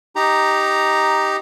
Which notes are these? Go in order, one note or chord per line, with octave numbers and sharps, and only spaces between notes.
D#4 G4 A#5